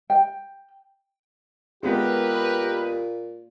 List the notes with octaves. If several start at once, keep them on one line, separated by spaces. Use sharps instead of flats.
G5
A#2 G#3 B3 G4 A#4 B4